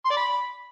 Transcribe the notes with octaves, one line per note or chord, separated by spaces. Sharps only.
C6
D5
B5